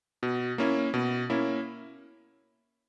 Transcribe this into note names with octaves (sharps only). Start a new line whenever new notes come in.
B2
A#3 C#4 E4
B2
A#3 C#4 E4